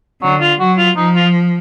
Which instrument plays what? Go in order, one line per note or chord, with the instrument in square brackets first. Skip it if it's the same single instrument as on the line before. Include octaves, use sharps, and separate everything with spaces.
[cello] D3 [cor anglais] F#3
[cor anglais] F4
[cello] F#3 [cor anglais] F#4
[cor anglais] F4
[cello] F3 [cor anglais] D#4
[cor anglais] F4